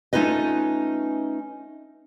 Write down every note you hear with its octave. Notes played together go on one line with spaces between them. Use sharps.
A3 C#4 D#4 F4 B4 D#5